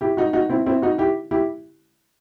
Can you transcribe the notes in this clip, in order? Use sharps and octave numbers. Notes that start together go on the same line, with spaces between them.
E4 G4
D#4 F#4
D#4 F#4
C4 E4
C4 E4
D#4 F#4
E4 G4
E4 G4